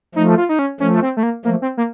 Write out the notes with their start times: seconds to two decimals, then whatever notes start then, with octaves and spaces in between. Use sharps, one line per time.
0.15 F3 A3 D#4
0.37 F4
0.49 D#4
0.59 C#4
0.80 F3 A3 C#4
1.02 C4
1.17 A3
1.23 A#3
1.45 F3 A3 A#3
1.62 C4
1.77 A#3